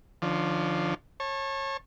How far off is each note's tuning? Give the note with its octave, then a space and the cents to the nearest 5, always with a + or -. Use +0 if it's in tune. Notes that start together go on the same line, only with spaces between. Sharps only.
D3 +35 F3 +0 C#4 +45
C#5 -25 A5 +0